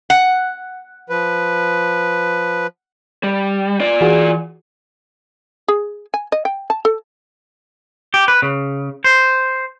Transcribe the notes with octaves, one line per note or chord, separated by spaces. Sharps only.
F#5
F3 B4
G3
F4 D5
E3 F#4 G#4
G#4
G#5
D#5
G5
A5
A4
G4
B4
C#3
C5